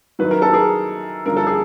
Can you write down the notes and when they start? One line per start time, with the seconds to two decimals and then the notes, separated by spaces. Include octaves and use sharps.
0.19 F#2 D#3 F#3 B4
0.31 A#4
0.42 A4
0.53 G#4 A#4
1.26 G2 D3 F3 A#4
1.37 A4
1.47 G#4